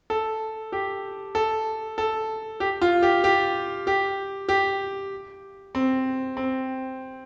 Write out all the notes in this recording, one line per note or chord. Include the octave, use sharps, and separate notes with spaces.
A4
G4
A4
A4
G4
F4
G4
G4
G4
G4
C4
C4